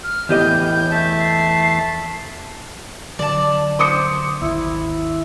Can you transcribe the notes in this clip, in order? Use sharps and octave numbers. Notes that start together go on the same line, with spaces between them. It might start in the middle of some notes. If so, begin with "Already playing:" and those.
F6
E2 A2 G4 D#5 G6
A3 E5 A5
C7
D3 F#3 D5 A5
C5 D6 D#6 C#7
G#1 D#2 E4